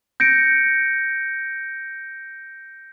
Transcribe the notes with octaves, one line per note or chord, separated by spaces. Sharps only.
G6 A#6 C#7 D7